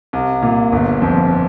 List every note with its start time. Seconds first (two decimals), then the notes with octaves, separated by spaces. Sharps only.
0.13 C2
0.42 A#2
0.72 G1
1.02 F2